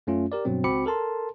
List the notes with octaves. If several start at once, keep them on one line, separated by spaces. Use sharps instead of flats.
F#2 A3 C#4 F4
G4 A#4 D5
G2 B2 F#3 C4
C#2 C4 F#4 B5 D6 C#7
A4 A#4 A5 C6